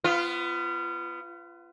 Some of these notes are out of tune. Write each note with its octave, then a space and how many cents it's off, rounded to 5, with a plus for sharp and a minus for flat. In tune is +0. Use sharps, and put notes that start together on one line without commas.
B3 +15 F4 -25